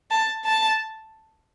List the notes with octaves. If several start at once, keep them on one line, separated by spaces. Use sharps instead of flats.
A5
A5